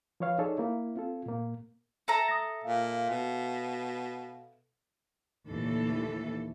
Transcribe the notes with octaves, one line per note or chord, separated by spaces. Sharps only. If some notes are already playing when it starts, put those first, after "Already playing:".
F3 B4 C#5 F5
D#4 G#4 A4 C#5 D5
A#3 E4
C4 F4 A4
A#2 A#3
A4 E5 A#5
D#6 A#6
A#2 F5
B2
D#2 A#2 D3 E3 A3 A4